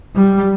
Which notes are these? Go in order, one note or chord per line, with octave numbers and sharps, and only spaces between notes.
G3